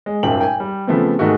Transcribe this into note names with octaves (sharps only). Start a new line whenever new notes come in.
G#3
D#1 G#1 F#2 G5 F#7
G5 G#5
G3
C#3 F3 A3 B3 C4
G#2 D#3 G#3 A3 F#4